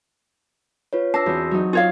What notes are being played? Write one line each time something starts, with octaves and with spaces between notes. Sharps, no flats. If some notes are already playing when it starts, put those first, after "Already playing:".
F4 B4 C#5
D4 A5 E6 A#6 C7
E2 C4 F#4
F#3 D#4
F4 C#5 F5